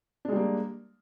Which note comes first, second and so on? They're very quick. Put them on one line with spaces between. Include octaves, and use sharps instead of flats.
D4 G#3 G3 A#3